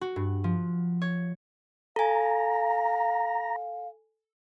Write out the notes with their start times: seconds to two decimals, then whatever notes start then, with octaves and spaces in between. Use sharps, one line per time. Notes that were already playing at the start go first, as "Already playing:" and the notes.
0.01 F#4
0.16 G2
0.44 F3
1.02 C#5
1.96 A4 F5 G#5 A#5